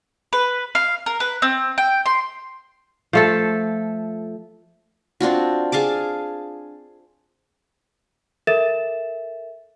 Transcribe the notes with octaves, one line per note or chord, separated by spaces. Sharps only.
B4
F5
A#4
B4
C4
G5
C6
F3 A3 A4
C4 D4 F4 F#4
G#4 F5 A5 D6
A4 A#4 E5 A6 E7